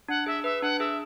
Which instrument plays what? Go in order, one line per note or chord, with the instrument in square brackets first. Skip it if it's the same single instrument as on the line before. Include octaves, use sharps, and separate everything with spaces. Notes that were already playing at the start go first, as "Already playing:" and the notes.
[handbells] D4 [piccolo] F#5
[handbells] G#4 [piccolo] E5
[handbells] B4 [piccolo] E5
[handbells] D4 [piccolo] F#5
[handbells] G#4 [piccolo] E5